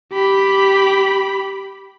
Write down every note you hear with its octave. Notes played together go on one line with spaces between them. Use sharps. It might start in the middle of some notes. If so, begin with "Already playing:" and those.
G4 B5